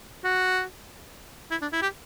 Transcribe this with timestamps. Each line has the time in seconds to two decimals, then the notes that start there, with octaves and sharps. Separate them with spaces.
0.24 F#4
1.51 E4
1.62 D4
1.73 E4
1.82 G4